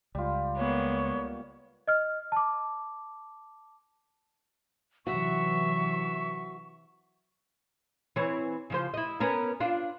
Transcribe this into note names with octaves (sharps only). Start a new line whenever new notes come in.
C#2 G3 F4
G#3 A#3 B3 C#5
D#5 F6
A5 D6
C3 E3 F#3 F#4 E5 C#6
E3 C4 C#5
C#3 F3 C5
E4 D#5
B3 C#4 A#4
D4 F4